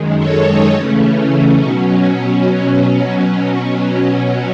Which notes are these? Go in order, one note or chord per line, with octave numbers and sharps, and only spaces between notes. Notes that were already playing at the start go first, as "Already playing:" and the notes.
Already playing: F#2 D#3 G#3
A4 C#5
D#4
C#3 E3 A3 C#4
B2 F#3 C#4 D#4
C#4